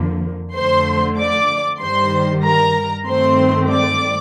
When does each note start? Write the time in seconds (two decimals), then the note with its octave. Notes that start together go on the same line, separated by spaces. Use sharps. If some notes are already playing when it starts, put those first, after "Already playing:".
Already playing: F2 D3 F3 A#3
0.54 F2 D3 A3 C5 C6
1.18 D5 D6
1.81 G2 D#3 G3 C5 C6
2.44 A#4 A#5
3.07 G2 D#3 A3 C4 C5 C6
3.70 D5 D6